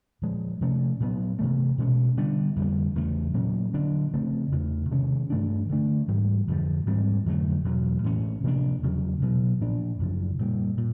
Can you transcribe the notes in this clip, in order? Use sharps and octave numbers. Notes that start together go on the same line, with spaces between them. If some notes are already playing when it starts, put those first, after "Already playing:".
A#2 F3 G#3
C3 F3 A3 C#4
A#2 F#3 B3
C3 E3 A3
B2 G#3 C#4
D3 G3 B3 D4
F2 D3 G3 A#3
E2 C#3 E3 A3
A#2 F#3 A#3 C#4
D3 F#3 A#3 D4
C#3 F3 A3 C4
E2 C#3 E3 A3
C3 D#3 G#3 C#4
G2 E3 A3 D4
D3 F#3 A3 D4
G#2 E3 G3
F2 D3 F3
G#2 E3 G3 C4
F2 D3 F#3 A3
E2 B2 F#3
A2 E3 G#3 C#4
C3 F3 A#3 D4
E2 C#3 F#3
B2 F#3 B3
A#2 F3 A#3 D4
F#2 C#3 F3
A#2 G3 A#3
A#2